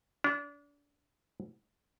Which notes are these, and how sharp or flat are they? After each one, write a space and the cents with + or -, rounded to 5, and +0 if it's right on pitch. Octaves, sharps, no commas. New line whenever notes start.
D4 -30